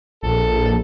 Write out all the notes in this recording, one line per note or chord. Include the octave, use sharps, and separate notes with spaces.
A#1 A4